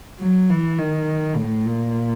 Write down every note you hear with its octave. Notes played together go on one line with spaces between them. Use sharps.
F#3
E3
D#3
A2
A#2